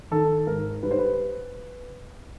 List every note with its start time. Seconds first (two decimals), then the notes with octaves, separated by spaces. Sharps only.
0.11 D#3 A4
0.47 G#2 A#4
0.83 G3 B4
0.91 C5
0.99 B4